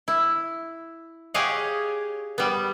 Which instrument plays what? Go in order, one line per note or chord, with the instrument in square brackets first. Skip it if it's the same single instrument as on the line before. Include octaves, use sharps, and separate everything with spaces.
[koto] E4
G4 G#4 C#5 D#5 F5 F#5
G3 B3